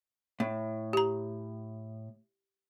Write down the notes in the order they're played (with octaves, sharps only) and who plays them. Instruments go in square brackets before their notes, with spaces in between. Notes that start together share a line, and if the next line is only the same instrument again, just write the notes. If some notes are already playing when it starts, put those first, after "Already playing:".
[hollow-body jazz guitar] A2
[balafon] G4 A#5